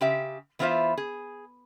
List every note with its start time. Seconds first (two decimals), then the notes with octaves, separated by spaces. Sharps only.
0.01 C#3 G4 E5
0.59 E3 B3 D4 F4 C5 E5
0.97 G#4